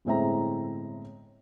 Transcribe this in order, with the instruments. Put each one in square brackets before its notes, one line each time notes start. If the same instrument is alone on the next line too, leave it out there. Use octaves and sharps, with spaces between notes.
[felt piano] G1 A2 G#3 C4 E5 A#5